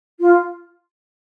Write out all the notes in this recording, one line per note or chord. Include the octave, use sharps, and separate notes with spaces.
F4